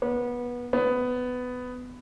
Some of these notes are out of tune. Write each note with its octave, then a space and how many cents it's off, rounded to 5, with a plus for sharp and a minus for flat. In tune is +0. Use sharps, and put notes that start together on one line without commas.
B3 -20
B3 +15